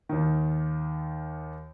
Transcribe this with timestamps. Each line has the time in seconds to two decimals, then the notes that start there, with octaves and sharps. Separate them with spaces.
0.09 D#2 D#3